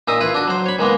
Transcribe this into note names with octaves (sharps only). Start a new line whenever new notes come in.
A#2 D#4 E5 D#6
E4 F4 B4
D4 F#4
F#3 C5
C#5 B5
D#3 G#3 A#3 B3